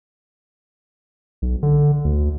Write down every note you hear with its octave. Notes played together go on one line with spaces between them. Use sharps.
B1
D3
D2